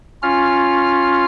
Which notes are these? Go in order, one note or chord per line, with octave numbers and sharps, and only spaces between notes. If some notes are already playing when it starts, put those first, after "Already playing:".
C#4 F4 F6